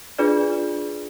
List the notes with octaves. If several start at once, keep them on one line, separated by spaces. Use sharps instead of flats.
D4 F4 G#4 B4 D5